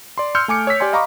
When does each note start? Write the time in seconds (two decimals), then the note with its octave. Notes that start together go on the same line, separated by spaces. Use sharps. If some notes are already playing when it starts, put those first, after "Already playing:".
0.18 D5 C6
0.35 C6 E6 F6 G6 C#7
0.48 A3 G#5 D6 C#7
0.67 C#5 E6 B6
0.80 G4 D5 G#5 C6
0.93 D#5 F5 A#5 B5 C#6 D6